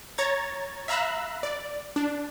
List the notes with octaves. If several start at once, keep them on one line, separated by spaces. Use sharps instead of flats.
C#5 A#5 G#6 A6
E5 F5 A#5 B5 E6 F#6
D5
D4